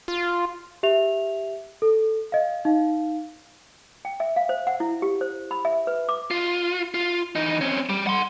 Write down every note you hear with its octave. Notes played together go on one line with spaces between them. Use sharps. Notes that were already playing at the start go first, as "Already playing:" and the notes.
F4
G4 E5 F7
A4
D#5 F5
D#4 F5
G5
E5
F5
C5
F#5
E4
G4
C5
B5
E5
B4
D6
F4
F4
E3 D#4
C4 C#4
G3
F#5 C6